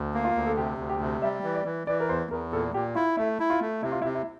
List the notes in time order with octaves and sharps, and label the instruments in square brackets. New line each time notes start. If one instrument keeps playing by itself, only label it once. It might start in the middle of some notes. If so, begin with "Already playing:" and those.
Already playing: [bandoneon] D2
A#3
[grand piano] F4
[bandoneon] D2
[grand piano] A4
[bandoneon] C3 [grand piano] G4
[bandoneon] D2
[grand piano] G4
[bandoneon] C3
[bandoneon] G3 [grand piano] E5
[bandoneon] E3
[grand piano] D5
[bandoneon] E3
[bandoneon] E3 [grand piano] D5
[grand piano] A#4
[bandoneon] E2 [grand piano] C5
[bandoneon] E2 [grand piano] A#4
[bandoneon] A#2 [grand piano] A4
[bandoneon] A#2 [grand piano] G4
[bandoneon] E4 [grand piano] F4
[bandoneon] A3 [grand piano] E4
[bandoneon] E4
[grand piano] F4
[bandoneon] A3
[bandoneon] C3 [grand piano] E4
[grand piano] F4
[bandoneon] C3 [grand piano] E4
[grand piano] E4